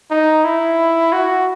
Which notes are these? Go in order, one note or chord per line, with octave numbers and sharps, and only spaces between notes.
D#4
E4
F#4